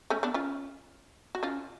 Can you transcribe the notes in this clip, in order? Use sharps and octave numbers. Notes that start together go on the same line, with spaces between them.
A3 C#4
B3 D4
C#4 F4
F#4
C#4 F4